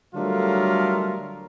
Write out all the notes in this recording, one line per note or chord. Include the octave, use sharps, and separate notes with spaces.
D3 F#3 G3 A3 F4 A#4